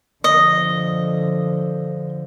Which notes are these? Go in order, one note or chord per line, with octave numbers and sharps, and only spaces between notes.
D3 F3 D#5